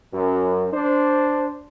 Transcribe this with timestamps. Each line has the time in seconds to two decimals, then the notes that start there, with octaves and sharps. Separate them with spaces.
0.12 F#2
0.73 D4 C5